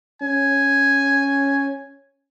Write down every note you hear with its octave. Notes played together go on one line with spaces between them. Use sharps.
C#4 G#5